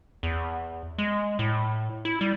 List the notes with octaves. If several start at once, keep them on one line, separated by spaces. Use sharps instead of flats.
E2
G#3
A2
E4
G3